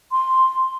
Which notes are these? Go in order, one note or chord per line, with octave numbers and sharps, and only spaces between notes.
C6